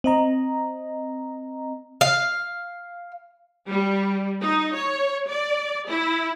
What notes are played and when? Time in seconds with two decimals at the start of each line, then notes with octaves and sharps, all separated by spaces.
0.04 C4 D#5 A#5
2.01 F5
3.68 G3
4.42 D#4
4.74 C#5
5.28 D5
5.88 E4